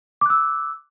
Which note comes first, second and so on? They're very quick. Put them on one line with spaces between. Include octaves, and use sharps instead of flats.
D6 F#6 E6